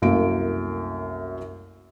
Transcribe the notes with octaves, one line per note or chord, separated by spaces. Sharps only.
C2 F#2 A3 A#3 D7